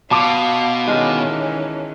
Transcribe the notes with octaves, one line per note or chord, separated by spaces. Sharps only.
B2 F5 A5 C6 D6
D#3 E3 G#3 C#4 F4 G4